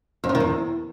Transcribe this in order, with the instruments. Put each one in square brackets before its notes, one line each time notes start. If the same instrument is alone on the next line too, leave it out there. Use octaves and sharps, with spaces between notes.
[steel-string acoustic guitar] F2
F#2
D#3
E2